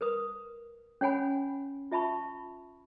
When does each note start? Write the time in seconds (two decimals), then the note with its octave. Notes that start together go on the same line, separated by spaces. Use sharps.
0.01 A#4 B4 D#6
1.01 C#4 C#5 F#5 G#5 B5
1.91 F4 E5 A5 B5 C#6